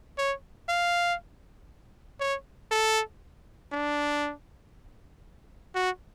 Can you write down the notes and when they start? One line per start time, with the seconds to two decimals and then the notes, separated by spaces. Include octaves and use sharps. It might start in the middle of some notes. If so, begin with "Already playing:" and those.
0.18 C#5
0.69 F5
2.20 C#5
2.71 A4
3.72 D4
5.75 F#4